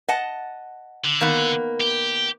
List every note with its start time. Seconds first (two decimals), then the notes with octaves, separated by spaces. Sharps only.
0.08 D#5 F#5 A5
1.05 D3
1.21 D#3 A#3 B3
1.80 G4